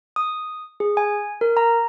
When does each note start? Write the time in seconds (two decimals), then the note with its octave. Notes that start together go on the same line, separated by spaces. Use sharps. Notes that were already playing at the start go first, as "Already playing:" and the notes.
0.16 D#6
0.80 G#4
0.97 G#5
1.41 A#4
1.57 A#5